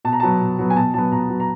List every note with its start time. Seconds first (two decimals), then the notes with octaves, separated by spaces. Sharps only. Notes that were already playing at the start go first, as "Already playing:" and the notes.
0.05 B2 A5
0.13 A#5
0.20 F#3 B3 A5
0.40 B2
0.58 F#3 B3
0.70 G#5
0.76 B2 A5
0.94 F#3 B3 A5
1.12 B2 A#5
1.29 F#3 B3
1.40 A#5